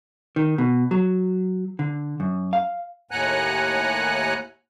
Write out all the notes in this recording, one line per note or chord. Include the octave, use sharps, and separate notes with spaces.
D#3
B2
F#3
D3
F#2
F5
D#2 A2 F#5 G#5 A#5 F#6